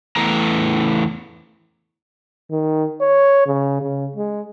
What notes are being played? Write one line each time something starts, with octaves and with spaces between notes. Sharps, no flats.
E2 E3 A3 B3 A#5
D#3
C#5
C#3
C#3
G#3